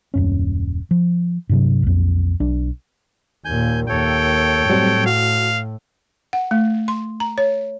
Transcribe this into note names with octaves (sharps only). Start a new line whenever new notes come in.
D#1 F#2 C#4
F3
G2 C3 F#3
B1 F2
B1 D4
D#2 A#2 G#5 G6
D#2 A4 C#5 G5
A2 F#3 G3 C4
F#4 F5
F#5
A3
C6
A#5
C#5